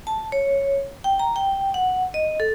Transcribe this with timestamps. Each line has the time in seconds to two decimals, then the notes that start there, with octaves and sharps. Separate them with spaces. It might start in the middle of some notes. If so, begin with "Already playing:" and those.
0.07 A5
0.32 C#5
1.04 G5
1.19 A#5
1.36 G5
1.74 F#5
2.14 D#5
2.40 A4